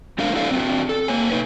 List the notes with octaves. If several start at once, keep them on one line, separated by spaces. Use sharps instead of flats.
G#3 A3 D4 A#4 F5
D4 E4 F#4 A4 D5 F5
C4 D4 F#4
A4
A#3 C#5 G#5
D#4 B4